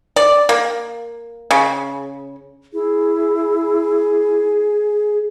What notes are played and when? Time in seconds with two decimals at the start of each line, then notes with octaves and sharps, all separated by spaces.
0.16 D5
0.49 A#3
1.51 C#3
2.73 E4 G#4